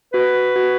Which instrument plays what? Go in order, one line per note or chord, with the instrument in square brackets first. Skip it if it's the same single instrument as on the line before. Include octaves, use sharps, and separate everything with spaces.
[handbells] F#4 [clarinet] B4
[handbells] F#4